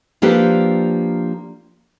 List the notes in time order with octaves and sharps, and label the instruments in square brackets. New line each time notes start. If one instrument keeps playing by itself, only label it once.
[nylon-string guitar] F3 A#3 D4 G4 A4 B4